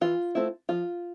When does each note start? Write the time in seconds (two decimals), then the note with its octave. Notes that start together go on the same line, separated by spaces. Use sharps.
0.01 E3 F4
0.35 A3 C4 E4
0.69 F3 F4